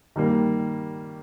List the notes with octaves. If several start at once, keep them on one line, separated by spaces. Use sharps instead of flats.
D#3 G3 A#3